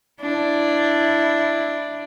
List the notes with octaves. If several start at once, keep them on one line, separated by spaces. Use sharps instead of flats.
D4 E4